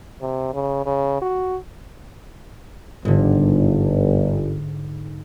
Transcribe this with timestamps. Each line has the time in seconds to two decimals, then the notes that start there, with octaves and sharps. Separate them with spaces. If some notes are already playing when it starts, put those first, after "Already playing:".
0.21 C3
0.54 C#3
0.85 C#3
1.22 F#4
3.05 G1 G#2 D3